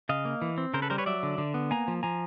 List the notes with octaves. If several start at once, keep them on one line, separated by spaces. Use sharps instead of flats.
C#3 D#5 F5
A#3
E3
C4
C#3 A#4 C5
A4 B4
G3 A#4 C5
B4 C#5
F#3 D5 E5
D3
D3
B3
A#3 G#5 A#5
F3
F3 G#5 A#5